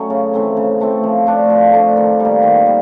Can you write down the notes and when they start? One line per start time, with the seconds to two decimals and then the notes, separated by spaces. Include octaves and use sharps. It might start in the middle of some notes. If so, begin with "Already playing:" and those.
Already playing: F#3 A3 C#4
0.10 C#3
0.34 E3 A3 C4
0.57 C#3
0.80 E3 A3 C4
1.03 F3
1.27 A3 D4
1.50 F3
1.73 A3 D4
1.97 D#3
2.20 G3 A#3
2.43 D#3
2.66 G3